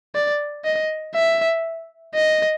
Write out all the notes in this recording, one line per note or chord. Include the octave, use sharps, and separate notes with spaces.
D5
D#5
E5
D#5